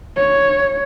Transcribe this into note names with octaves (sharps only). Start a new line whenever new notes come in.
C#5